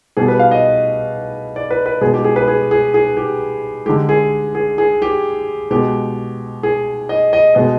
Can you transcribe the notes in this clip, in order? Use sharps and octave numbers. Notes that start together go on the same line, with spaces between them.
B2 G3 G#4
B4
F5
D#5
D5
B4
B4
B2 G#3 G#4
G4
G#4
B4
G#4
G#4
G#4
G4
D3 G#3 G4
G#4
G#4
G#4
G4
B2 G#3 G4
G#4
D#5
D#5
B2 G#3 D#5